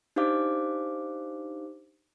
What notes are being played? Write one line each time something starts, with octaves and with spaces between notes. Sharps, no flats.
D4 D#4 G4 C5 F5 D6